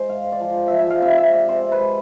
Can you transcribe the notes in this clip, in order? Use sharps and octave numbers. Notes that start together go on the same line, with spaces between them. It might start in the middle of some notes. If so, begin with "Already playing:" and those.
Already playing: G#3 C5
G#2 F5
G#2
D5
F3
G#2
F3 E5
E5
G#3 F5
C3 E5
C3 E5
C3 D5
C3 C5
C3
B4
G#3